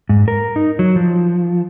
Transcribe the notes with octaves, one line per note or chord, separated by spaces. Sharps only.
G#2
A#4
D#4
F#3
F3